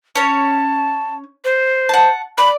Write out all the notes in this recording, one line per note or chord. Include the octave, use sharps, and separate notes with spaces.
C#4 C#5 A5
C5
F#5 A5
D5 B5